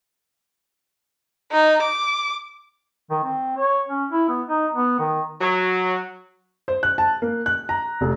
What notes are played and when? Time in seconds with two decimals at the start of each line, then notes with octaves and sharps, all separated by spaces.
1.52 D#4
1.82 D6
3.11 D#3
3.24 C4
3.57 C#5
3.88 C#4
4.10 E4
4.29 B3
4.48 D#4
4.73 B3
4.99 D#3
5.41 F#3
6.68 C5
6.83 F#6
6.98 A5
7.22 A#3
7.46 F#6
7.69 A#5
8.01 F1